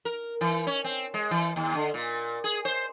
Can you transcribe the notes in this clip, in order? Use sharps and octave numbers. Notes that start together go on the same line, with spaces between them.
A#4
E3
C#4
C4
G#3
E3
D#2
D3
A#2
G#4
C5